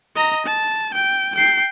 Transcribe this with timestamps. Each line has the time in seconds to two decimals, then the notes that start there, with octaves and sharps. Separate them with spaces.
0.16 D#5 A#5
0.46 A5
0.94 G5
1.35 G5 C7